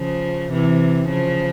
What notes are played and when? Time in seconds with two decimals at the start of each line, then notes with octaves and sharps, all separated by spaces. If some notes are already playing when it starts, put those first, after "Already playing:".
Already playing: C#3 F3
0.51 C3 E3
1.08 C#3 F3